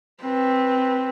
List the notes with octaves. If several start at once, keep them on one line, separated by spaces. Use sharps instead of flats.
C4 B4